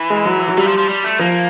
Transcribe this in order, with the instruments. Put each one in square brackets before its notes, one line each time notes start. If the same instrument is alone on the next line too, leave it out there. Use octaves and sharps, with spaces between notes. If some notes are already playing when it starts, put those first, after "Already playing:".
Already playing: [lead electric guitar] E3
[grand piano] G#3
F#3
F#3
[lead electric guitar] E3 [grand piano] G3
[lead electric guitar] F3
F3
G3
A3
[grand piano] F3 [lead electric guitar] A#3